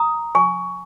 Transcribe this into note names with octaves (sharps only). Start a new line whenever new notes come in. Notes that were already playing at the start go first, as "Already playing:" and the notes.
Already playing: A#5 D#6
G#5 C#6